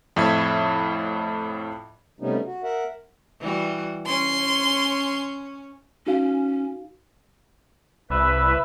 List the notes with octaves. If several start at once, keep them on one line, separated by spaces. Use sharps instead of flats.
F2 A2 E5 B5 G#6
C3 G3 A3 B3 C#4 D#4
F#4
A#4 E5 F#5
E3 G3 F#4
C#4 C6
C#4 D#4 F#4 F5
C2 B4 E5